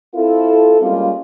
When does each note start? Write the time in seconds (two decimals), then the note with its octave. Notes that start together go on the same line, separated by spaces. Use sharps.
0.13 C4 E4 F4 A4
0.81 G3 G#3 A#3 C#4 F4